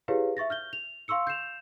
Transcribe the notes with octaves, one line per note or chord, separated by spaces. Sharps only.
E4 G4 G#4 B4 C#5 F5
E5 C#6 A6 A#6
F6 G6 G7
F7
F5 C6 C#6 E6 C#7
G6 C7 E7 F7